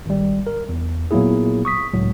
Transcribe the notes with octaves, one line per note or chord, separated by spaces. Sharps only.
G#1 G3
A#4
E2
A#2 F#3 A#3 B3 E4 G#4
C#6 D#6 B6
C#2 A2 F#3